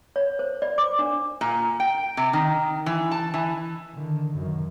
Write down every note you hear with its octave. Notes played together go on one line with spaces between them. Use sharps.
C#5
C5
D5
D6
D4
A#2
G5
C3
D#3
E3
A5
E3
D3 D#3
F#2 D#3